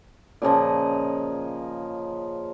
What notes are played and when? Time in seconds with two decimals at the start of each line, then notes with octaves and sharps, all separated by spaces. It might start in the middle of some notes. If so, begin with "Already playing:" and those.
0.42 A#2 C#3 F3 D#5